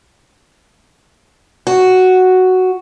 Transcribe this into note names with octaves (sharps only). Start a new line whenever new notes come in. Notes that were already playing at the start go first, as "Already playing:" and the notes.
F#4